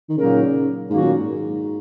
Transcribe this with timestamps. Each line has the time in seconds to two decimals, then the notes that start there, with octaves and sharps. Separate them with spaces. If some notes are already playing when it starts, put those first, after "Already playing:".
0.09 D#3
0.17 A#2 C#3 F#3 A#3 D#4 A#4
0.89 G#2 D#3 F#3 A#3 C#4 F#4
1.01 A#2
1.14 G#2